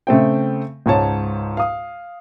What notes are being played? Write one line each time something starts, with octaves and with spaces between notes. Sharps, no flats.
C#3 A3 C4 G5
C#2 G#2 C#5 A5
F5 D#6